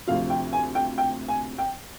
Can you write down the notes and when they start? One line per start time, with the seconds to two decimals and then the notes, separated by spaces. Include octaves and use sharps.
0.07 D2 C3 F3 F5
0.30 G5
0.53 G#5
0.75 G5
0.98 G5
1.28 G#5
1.58 G5